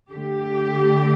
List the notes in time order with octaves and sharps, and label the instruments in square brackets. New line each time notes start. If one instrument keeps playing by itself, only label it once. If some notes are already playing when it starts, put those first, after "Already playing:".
[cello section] D3 A3 G4